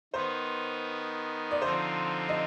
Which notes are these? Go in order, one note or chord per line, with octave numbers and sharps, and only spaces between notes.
D#3 B3 D#4 C5
D5
D3 F3 C4 D#4 C5
D#5